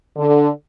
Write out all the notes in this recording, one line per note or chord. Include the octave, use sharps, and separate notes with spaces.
D3